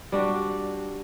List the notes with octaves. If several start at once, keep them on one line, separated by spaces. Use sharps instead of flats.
G3 D4 F#4